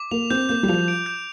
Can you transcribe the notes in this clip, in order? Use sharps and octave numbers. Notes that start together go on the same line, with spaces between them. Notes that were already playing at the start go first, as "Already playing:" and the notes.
Already playing: D6
A#3 F7
C4 G6
A#3 G6
G3
F3 F7
D7
G6